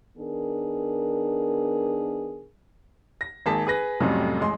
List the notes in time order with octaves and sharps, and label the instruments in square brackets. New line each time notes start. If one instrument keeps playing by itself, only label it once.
[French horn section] D#3 B3 D4 G#4 A#4
[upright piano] A#6
G#1 A#3 G#4 A5 B6
G#4 B4 A#6
F2 A2 C3 F#3 G3 C#4
A1 G#3 C6